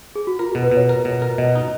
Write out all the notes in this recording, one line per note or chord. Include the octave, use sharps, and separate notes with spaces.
G#4
F#4
F4 A#4
B2 G#4
B4
B2
C#5
A#4
B2
A#4
B2 D#5
D#4